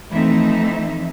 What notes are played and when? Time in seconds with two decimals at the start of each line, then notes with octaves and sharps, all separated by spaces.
0.10 E3 F3 A3 C4 D#4 E5